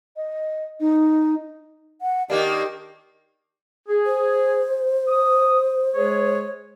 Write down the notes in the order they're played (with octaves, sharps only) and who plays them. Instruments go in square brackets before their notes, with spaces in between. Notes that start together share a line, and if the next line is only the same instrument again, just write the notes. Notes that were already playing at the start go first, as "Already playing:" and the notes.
[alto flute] D#5
D#4
[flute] F#5
[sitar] D#3 A#3 D4 [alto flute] G4 [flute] D#5
[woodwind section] G#4
[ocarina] C5
[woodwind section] D#6
G#3 G#4 C#5